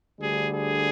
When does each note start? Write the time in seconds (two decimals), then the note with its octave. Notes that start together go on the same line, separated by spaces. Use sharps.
0.20 D2 D3 G3 G#4
0.53 G#4